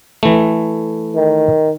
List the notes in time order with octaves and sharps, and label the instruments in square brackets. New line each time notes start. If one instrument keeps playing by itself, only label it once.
[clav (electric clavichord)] E3 A3
[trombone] D#3